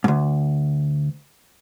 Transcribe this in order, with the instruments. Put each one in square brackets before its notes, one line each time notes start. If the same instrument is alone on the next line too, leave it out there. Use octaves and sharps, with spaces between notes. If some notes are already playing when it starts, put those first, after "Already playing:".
[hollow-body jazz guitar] D2 G#2